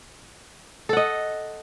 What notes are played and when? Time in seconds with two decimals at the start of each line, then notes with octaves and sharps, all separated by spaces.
0.89 A4
0.93 F#5
0.97 D#5